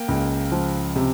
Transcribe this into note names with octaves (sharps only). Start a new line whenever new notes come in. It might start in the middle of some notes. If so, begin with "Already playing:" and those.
Already playing: A#3 G5
C#2
F3
C3